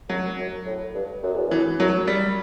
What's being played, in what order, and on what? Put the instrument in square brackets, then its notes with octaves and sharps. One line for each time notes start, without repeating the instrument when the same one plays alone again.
[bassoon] F#2 [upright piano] F#3
[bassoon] F#2
A2
G2
F#2
E2
[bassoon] F#2 [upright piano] E3
[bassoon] F#2 [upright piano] F#3
[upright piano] G3